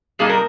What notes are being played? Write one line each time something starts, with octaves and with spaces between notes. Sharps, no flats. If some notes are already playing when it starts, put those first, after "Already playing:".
A#2 G3 A#3 D#4 G#4
A#4